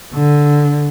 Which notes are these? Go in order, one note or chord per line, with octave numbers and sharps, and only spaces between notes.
D3